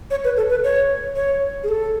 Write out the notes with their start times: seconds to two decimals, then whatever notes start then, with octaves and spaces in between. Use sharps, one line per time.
0.11 C#5
0.24 B4
0.37 A4
0.50 B4
0.64 C#5
1.16 C#5
1.64 G#4
1.68 A4